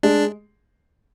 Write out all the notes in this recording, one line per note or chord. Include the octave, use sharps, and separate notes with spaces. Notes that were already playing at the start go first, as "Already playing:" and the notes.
G#3 D4